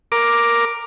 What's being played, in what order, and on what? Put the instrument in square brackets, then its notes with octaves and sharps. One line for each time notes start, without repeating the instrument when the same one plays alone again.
[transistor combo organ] A#4 D6